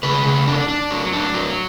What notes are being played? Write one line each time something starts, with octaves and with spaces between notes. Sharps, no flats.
C#3 B4
C#3
D4
D4
F#3
D4
F#3